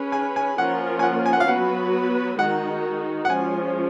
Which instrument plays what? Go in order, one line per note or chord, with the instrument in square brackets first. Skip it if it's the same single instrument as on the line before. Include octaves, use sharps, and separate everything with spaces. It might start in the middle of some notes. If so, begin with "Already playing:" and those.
Already playing: [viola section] C#4 G#4 B4
[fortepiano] G#5
G#5
[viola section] F3 A#3 C#4 F4 A#4 [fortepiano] F#5
[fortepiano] G#5
F#5
G#5
F#5
F5
[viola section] F#3 B3 F#4 B4 [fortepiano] F#5
[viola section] D#3 G#3 D#4 F#4 [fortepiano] F#5
[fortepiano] F#5
[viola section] F3 G#3 C#4 [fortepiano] G#5